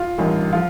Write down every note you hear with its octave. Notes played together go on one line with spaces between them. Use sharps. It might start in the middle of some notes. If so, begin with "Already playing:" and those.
Already playing: F4
A1 G2 D#3
F3 F4